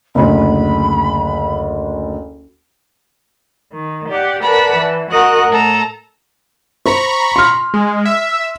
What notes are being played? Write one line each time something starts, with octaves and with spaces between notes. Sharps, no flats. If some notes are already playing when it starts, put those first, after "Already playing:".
F#1 D2 B5
D#3
G4 D5 F#5
A#4 B4 D5 F#5 A5 B5
E3
F#4 A#4 D#5 F#5 F#6
A2 A4 A#5
C5 A#5 B5 C#6
C6 F6
G#3
E5